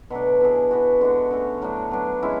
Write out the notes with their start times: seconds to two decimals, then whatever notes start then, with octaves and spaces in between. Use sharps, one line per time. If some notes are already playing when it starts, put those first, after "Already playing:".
0.10 B2 F#3 A3 D4
0.40 E3 B3 E4 G#4
0.71 E3 B3 F#4
1.01 D3 G#3 D4 F#4
1.31 D3 A3 C#4 F#4
1.62 A2 F#3 A3 D4
1.91 F#3 B3 D4
2.22 G#3 C#4 E4